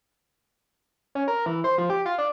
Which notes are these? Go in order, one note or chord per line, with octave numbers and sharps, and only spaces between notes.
C#4
A#4
E3
C5
F3
G4
F4
D4